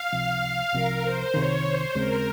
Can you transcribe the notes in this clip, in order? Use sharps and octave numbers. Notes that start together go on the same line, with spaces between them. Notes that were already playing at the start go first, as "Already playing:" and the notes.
Already playing: F5
C#2 C3 F3
C2 C3 F3 A#4
C5
C2 C3 D#3 C#5
C5
D#2 C#3 G#3 C4 A#4